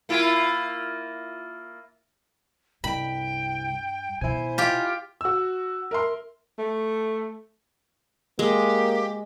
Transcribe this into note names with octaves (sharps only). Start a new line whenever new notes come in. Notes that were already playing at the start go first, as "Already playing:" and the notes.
A#3 E4 F4
C2 G2 G5 B5
B2 D#3 E4 C5 G#5
F4 G4
F#4 E6
A#4 E5 C6
A3
G#3 A#3 G4